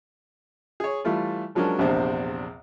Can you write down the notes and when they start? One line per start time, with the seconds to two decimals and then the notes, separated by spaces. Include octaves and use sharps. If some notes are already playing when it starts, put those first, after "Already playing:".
0.80 G#4 C#5
1.05 E3 G3 A3 E4 F4
1.55 F3 F#3 G#3 C#4 D4 A#4
1.79 A#1 E2 C3 C4 D4 C5